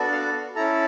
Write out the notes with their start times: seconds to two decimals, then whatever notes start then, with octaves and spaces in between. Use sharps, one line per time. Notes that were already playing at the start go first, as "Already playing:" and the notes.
Already playing: B3 D4 F#4 A4
0.12 F5
0.55 C#4 E4 A4 A#5